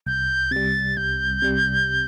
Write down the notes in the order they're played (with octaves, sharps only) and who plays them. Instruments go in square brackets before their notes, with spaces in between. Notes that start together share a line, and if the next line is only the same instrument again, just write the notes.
[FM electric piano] C2 [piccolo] G6
[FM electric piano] C3 G3 [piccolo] A6
[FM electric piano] C2 [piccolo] G6
[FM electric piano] C3 G3